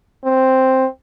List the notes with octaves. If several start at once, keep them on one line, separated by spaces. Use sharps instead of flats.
C4